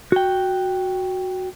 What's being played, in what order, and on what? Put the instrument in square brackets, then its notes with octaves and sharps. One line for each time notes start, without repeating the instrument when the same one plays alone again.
[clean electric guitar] F#4 G5